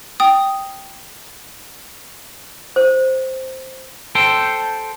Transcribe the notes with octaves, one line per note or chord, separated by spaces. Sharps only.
G5 D#6
C5
A4 C5 G5